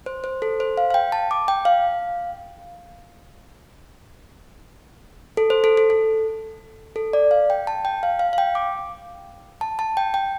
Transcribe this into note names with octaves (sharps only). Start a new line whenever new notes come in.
C5
C5
A4
C5
F5
F5
G5
A5
D6
G5
F5
A4
C5
A4
A4
A4
A4
D5
F5
G5
A5
G5
F5
F5
F5
G5
D6
A5
A5
G5
G5